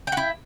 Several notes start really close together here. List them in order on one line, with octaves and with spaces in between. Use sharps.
G5 F#4 E4